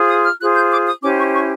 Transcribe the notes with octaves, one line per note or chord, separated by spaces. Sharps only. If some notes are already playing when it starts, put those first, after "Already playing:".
Already playing: F4 G#4 C5
D#6
F6
F4 G#4 C5 F#6
G6
D6
D#6
C#4 E4 G4 C5 D6
C#6
C#6